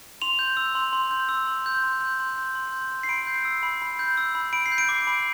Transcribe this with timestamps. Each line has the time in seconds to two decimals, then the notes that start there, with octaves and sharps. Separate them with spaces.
0.22 C6 F7
0.39 G6
0.57 E6
0.75 C6
0.93 C6
1.11 G6
1.29 E6
1.47 C6
1.66 G6
1.84 C6
2.01 G6
2.20 C6
2.38 G6
2.55 C6
2.73 G6
2.92 C6
3.03 C7
3.09 B5 D7
3.27 G6
3.45 E6
3.63 B5
3.82 B5
3.99 G6
4.17 E6
4.35 B5
4.53 B5 D7
4.66 C7
4.72 G6
4.78 D7
4.89 D6
5.07 B5